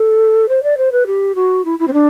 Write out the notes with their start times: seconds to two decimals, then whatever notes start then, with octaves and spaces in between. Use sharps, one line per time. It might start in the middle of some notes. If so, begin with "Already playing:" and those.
Already playing: A4
0.48 C5
0.63 D5
0.77 C5
0.92 B4
1.06 G4
1.35 F#4
1.65 E4
1.79 E4
1.87 C4
1.93 D4